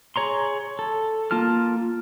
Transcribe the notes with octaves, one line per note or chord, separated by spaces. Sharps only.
G#4 C#5 A#5 C6
A4
A#3 F4 A5 F6